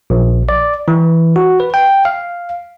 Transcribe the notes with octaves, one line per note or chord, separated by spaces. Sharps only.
A#1
D5
E3
F#4
B4
G5
F5